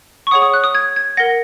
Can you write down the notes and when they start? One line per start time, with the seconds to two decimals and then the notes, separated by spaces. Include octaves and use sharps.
0.27 C#6
0.31 G#4 C#5 F#5 D#6
0.42 D#6
0.54 F#6
0.64 D#6
0.75 G#6
0.96 G#6
1.17 A#4 F#5 A#6